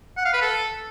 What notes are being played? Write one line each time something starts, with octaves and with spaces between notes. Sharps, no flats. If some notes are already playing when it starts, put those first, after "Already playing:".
F#5
F5
B4
A4